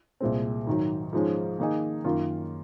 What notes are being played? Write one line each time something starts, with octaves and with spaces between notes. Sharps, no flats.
C2 A#2 G#3 C4
G#2 D#3 F#3
G#2 F3 G#3 C#4
D#3 A#3 D#4 G#4
F#2 D#3 A#3 F4